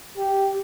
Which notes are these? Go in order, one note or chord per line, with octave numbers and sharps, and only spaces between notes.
G4